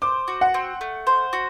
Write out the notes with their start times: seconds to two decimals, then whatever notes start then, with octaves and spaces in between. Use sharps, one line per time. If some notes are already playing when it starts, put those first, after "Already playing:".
0.02 C5 D6
0.28 F#4
0.41 F#5
0.54 C4
0.81 A3
1.07 C5
1.33 F#4